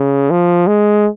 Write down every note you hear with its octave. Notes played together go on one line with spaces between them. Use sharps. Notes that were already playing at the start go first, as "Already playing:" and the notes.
Already playing: C#3
F3
G#3